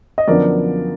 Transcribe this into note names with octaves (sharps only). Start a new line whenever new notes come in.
D#5
F#2 D3 F3 B3 A#4 D5